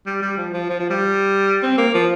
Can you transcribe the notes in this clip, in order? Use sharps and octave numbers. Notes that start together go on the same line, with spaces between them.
G3
G3
F3
F3
F3
F3
G3
C4
A#3
F3